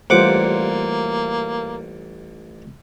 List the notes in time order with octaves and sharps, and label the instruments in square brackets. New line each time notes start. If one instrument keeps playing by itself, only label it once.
[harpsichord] A1 F#5 D6 [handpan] G3 F4 C5 [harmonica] A#3